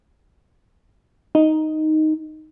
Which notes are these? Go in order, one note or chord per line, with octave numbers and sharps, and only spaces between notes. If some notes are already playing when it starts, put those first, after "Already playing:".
D#4